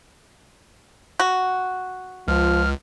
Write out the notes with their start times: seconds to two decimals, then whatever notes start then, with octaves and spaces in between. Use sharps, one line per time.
1.20 F#4
2.28 C#2 F3 F6